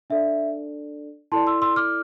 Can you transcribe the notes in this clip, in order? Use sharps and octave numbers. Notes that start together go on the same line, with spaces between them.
D4 A4 D5 E5
E4 A4 D5 A5 C6
C6 E6
C6 E6
D6 F6